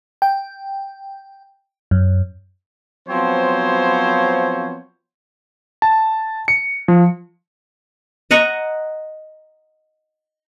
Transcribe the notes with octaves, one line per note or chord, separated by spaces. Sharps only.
G5
F#2
F3 F#3 B3 C4 C5 C#5
A5
C#7
F3
D#5 F#5 A#5 C#6